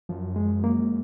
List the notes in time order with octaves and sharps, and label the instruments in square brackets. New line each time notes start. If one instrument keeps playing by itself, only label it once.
[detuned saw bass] F#2 [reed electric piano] F3
[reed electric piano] G#3
A#3